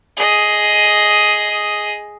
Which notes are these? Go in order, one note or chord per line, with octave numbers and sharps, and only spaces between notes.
G#4 D#5